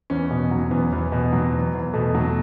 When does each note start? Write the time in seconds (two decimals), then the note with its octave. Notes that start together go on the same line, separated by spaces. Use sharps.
0.10 E2 C#4
0.31 B2
0.51 F#3
0.71 E2 B3
0.92 E2
1.12 B2
1.33 F#3
1.54 E2
1.74 E2
1.94 B2 A3
2.15 F#3